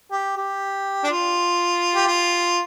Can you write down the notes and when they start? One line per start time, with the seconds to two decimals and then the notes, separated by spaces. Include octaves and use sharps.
0.11 G4
0.36 G4
1.04 D4
1.09 F4
1.95 G4
2.07 F4